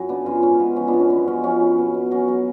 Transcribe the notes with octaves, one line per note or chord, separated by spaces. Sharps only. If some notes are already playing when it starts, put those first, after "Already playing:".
Already playing: F#2 F#3
C#3 B3 D4
F#2 C#4 F4
G#2 C#4
G#3 B3
F3 C#4
B3 D4
G#2
C#4
F#2 B3
G#3 C#4
F3 C#4
F#2
B2
B2
F#3 C#4
F#3